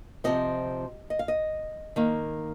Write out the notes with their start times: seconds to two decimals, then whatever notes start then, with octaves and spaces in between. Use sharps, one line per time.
0.24 C3 F3 C4 D#5
1.10 D#5
1.19 F5
1.28 D#5
1.96 D#3 A#3